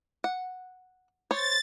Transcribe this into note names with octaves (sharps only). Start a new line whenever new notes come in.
F#5
C5 C#5 A6